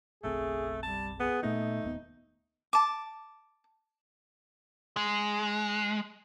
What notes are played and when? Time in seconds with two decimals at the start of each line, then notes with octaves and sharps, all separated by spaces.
0.23 F#1 B1 A3 C4 G#4
0.82 G3 A5
1.20 B3 G#4
1.43 A#2 A3 B3 D#4
1.83 D#1 D#2 B3
2.73 A5 D6
4.97 G#3